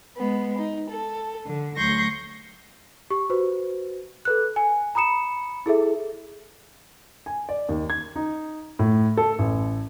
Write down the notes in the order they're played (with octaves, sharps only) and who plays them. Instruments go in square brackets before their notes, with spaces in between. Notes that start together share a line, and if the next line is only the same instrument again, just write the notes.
[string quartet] G#3 B3
D#4
A4
D3
D2 F#3 C6 C#6 G6 A#6
[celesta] G4 C#6
F#4 B4 C5
A4 B4 F#6
G#5
A#5 B5 D#6 C#7 E7
E4 G#4 A4 E5
[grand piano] G#5
D5
D#2
G#6
D#4
A2
A4
A1